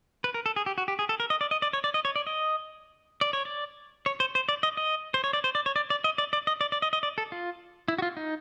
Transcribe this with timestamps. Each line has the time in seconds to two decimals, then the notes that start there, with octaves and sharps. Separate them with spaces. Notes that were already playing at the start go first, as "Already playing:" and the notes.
0.24 B4
0.34 A#4
0.46 A4
0.56 G#4
0.66 G4
0.78 F#4
0.88 G4
0.99 G#4
1.09 A4
1.20 A#4
1.30 D#5
1.41 D5
1.51 D#5
1.62 D5
1.73 C#5
1.84 D5
1.94 D#5
2.05 C#5
2.16 D5
2.27 D#5
3.21 D5
3.33 C#5
3.45 D5
4.06 C#5
4.20 C5
4.35 C5
4.49 D5
4.63 D#5
4.77 D#5
5.14 C5
5.24 C#5
5.33 D5
5.44 C5
5.55 D5
5.66 C#5
5.76 D5
5.90 D5
6.04 D#5
6.18 D5
6.33 D5
6.47 D#5
6.61 D5
6.72 D5
6.82 D#5
6.93 D#5
7.03 D5
7.18 A4
7.32 F4
7.88 E4
7.98 F#4
8.02 F4
8.17 D#4